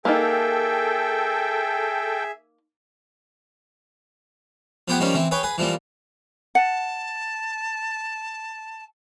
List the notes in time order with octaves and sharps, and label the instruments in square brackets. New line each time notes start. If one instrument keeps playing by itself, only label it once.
[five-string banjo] A#3 D#4 [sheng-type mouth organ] G#4 E5 [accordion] A4 G5
[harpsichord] F3 B3 G4 G#4 F#5
D#3 F3 G3 A#3 C#4
E3 C4
G#4 B4 C#5 G5
G#4 B4
E3 F3 G3 A#3
[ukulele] F#5 [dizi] A5